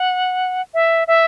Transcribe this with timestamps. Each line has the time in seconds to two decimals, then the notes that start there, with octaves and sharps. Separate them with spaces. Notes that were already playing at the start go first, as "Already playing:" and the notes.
Already playing: F#5
0.74 E5
1.07 E5